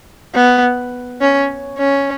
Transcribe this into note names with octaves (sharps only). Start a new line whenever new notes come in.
B3
C#4
C#4